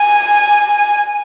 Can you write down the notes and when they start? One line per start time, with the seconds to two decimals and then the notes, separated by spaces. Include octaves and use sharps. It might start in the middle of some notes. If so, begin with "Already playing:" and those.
Already playing: G#5